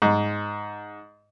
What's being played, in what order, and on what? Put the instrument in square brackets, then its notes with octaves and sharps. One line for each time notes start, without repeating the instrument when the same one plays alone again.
[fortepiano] G#2